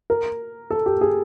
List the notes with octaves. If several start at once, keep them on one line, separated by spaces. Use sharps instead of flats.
A#4
A4
G4
G#4